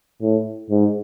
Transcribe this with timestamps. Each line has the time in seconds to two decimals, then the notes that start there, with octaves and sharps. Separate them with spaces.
0.22 A2
0.70 G#2